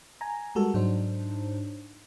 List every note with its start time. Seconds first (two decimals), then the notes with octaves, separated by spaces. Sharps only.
0.21 G#5 A#5
0.55 G3 G#3 F#4 A4 A#4
0.74 G#2 F#3 D4 D#4 C5